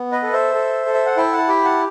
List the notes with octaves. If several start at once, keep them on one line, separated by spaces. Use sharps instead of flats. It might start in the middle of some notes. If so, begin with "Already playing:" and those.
Already playing: B3
B4 D#5
A4
C5 E5
A4
A4
E5
F#5
E4 E5 G5
F#5 A5
G4 G5 B5
F#5 A5